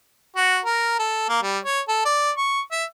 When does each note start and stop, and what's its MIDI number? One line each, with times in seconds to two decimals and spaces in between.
0.36 0.59 66
0.65 0.95 70
0.99 1.27 69
1.29 1.39 58
1.43 1.59 55
1.64 1.81 73
1.88 2.03 69
2.05 2.31 74
2.37 2.61 85
2.72 2.84 76